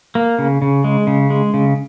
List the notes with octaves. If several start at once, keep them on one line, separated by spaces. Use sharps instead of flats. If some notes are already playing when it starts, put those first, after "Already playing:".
A#3
C#3
C#3
G#3
C#3
G#3
C#3